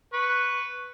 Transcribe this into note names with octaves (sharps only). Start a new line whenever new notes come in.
B4 C#6